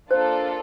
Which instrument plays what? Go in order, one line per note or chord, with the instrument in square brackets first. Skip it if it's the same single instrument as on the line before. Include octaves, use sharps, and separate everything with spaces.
[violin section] A#3 D4 F4 A4 [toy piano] C5